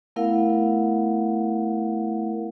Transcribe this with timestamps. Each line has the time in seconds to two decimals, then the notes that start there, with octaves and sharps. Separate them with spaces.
0.16 A3 B3 E4 A#4 F5 F#5